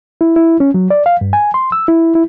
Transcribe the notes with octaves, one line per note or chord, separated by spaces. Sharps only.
E4
E4
C#4
F#3
D5
F5
G2
G#5
C6
E6
E4
E4